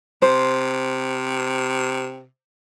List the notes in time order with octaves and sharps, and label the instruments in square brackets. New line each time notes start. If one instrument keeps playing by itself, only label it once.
[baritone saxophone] C3 [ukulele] C5